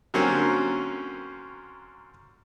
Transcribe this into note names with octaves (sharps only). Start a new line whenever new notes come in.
D3 F#3 A#3 C4 C#4